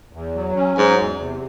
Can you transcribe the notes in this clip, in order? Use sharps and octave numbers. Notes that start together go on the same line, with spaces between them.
E2
F#3
C#4
G#2 F#3
E2
C3